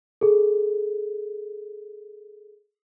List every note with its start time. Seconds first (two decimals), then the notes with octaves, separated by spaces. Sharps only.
0.21 G#4 A4